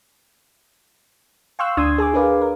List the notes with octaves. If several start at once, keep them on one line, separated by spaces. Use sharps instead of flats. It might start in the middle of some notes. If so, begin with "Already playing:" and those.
F5 G5 C6 C#6 E6 F#6
D2 D4 C6 D#6 E6 G#6
G#4 G#5 D6
D4 G#4 A#4 B4 D5 F5
A#4